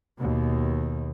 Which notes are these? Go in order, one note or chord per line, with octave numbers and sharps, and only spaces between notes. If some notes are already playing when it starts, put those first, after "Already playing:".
D#2 B2